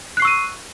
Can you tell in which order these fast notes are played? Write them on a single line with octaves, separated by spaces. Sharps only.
F#6 C7 C#6 E6 D#7